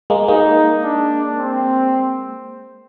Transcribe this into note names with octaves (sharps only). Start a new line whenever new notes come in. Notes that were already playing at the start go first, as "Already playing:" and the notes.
G#3 A#3
G#3 A#3 D#4
D4
C4